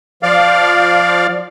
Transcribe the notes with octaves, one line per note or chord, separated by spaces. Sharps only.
F3 D5 F5